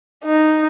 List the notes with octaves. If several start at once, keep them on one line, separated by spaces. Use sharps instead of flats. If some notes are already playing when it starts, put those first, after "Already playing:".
D#4